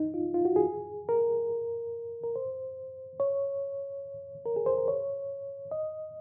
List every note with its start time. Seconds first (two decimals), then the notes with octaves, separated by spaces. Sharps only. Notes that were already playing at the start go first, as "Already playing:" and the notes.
Already playing: D#4
0.14 F4
0.34 F4
0.45 F#4
0.56 G#4
1.09 A#4
2.24 A#4
2.36 C5
3.20 C#5
4.46 A#4
4.56 G#4
4.66 C5
4.78 A#4
4.88 C#5
5.71 D#5